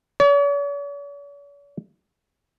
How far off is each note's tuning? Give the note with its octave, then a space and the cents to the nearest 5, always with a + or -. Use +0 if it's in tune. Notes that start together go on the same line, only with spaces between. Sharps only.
C#5 +45